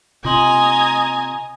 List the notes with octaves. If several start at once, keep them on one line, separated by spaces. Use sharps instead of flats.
C3 F4 D#5 G#5 A#5 C6 F#7